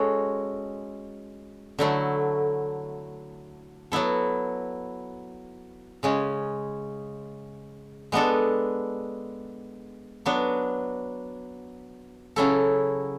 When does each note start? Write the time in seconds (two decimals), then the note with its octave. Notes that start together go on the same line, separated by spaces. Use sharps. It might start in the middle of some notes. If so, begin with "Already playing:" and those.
Already playing: G#3 C#4 F#4 A4
1.79 D3 F#3 A3 E4
3.92 F#3 B3 E4 A4
6.03 C#3 G#3 C#4
8.12 G#3 B3 D4 A4
10.26 F#3 B3 D4
12.36 C#3 F#3 C#4 E4 A4